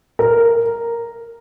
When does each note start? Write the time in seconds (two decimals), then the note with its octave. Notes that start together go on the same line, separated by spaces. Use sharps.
0.19 A#4